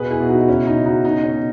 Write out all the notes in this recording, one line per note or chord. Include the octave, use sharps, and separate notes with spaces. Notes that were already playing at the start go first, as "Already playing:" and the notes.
Already playing: B2 G#4 B4
E4 G#4
B2
D#4 F#4
F#4
C#3 C#4 E4
D#4
C#3
D#4 F#4
B2 D#4
C#4
B2